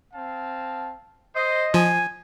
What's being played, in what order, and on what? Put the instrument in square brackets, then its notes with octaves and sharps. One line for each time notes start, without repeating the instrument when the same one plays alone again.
[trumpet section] C4 F5 A5
[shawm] C5 [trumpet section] D#5
[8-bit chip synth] F3 [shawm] G#5